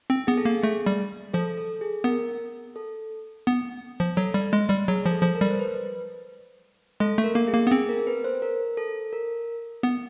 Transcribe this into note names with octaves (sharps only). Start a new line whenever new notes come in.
C4
B3 G#4
A4
A#3 G#4
A3 G#4
G3
F3 A4
A4
G#4
B3 A#4
A4
B3
F3
F#3 A4
G3
G#3
G3
F#3 G#4
F3
A4
F3
A#4
G3
C5
B4
G#3 A4
A3
A#4
A#3
G#4
A#3
B3
C4 G#4
A#4
B4
C5
A#4
A4
A#4
B3